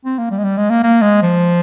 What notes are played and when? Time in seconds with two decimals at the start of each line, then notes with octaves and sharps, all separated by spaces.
0.05 C4
0.18 A#3
0.31 G3
0.38 G#3
0.44 G3
0.57 G#3
0.70 A#3
0.83 A#3
1.02 G#3
1.22 F3